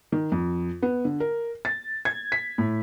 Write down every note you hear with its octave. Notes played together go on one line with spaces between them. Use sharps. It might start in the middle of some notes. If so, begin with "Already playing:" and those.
D#3
F2
B3
D3
A#4
A6
G#6
B6
A2